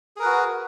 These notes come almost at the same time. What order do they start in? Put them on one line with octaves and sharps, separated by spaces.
G#4 A#4 B4 F#4